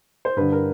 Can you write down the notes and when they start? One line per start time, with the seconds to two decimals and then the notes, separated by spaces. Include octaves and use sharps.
0.25 C5
0.37 G2 D3 B4
0.52 A#4